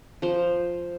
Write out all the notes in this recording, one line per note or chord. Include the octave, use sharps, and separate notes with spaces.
F3 C5